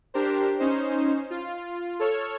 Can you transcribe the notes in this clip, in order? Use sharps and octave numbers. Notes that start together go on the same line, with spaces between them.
D4 G4 A#4 C5
C#4 D#4 C5
F4
A4 C#5 F6